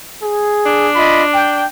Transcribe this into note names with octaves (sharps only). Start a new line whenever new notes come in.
G#4
D4
F4 D#5 B5
G5